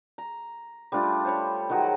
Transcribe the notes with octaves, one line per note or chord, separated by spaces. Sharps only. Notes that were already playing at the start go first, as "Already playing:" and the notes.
A#5
G3 A3 D4 F4
C5 C#5 B5
D#3 F#3 F#4 G#4